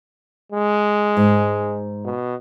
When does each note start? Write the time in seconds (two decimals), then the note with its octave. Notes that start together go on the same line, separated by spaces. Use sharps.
0.52 G#3
1.17 G#2
2.05 B2